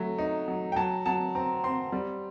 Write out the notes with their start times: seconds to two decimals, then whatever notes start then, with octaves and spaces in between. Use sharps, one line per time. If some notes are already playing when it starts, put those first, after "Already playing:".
Already playing: F#3 A3
0.18 D#4
0.48 F#3
0.72 G5
0.76 F#3 A5
1.06 F#3 A5
1.35 C4 A#5
1.64 C4 C6
1.92 G3